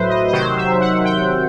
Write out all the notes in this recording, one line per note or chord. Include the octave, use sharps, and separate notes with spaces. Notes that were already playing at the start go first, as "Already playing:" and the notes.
Already playing: A2 F#3 B4 C5 E5
D#5
D#5
C3 D#3 F#3 C5
E5
F#5
G5